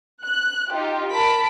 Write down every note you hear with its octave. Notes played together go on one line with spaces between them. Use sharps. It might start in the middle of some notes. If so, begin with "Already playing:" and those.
F#6
D#4 F4 G4
A#4 A5 B5 B6 D7